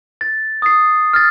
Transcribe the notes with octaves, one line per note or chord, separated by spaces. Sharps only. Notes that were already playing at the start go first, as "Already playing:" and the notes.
A6
D#6 C7
F6 A6